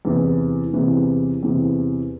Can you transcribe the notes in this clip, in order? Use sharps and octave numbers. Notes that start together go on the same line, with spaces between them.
E2 C3 E3
E2 C3 E3
E2 C3 E3